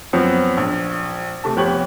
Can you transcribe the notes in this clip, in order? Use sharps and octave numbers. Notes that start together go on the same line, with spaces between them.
F#2 F3 B3 C4
A#1
C3 A3 A5
F1 F2 B3 G4 C#5 F#7